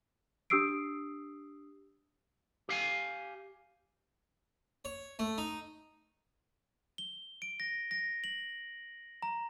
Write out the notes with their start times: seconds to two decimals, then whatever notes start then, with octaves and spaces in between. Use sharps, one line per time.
0.50 D4 G4 D#6 E6 C7 D7
2.69 G4 F5 G#5
4.85 C#5
5.19 A3
5.38 D#4
6.98 G7
7.42 D7
7.60 A#6
7.91 A#6
8.24 F#7
9.22 A#5